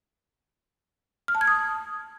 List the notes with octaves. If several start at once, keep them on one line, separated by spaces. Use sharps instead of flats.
F6
A5
G#6
D#6